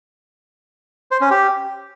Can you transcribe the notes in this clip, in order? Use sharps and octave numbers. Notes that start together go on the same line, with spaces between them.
C5
C#4
G4